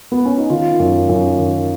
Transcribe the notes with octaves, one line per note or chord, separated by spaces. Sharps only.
B3
C#4
D#4
D#3 F4
F#2
F#2
D#3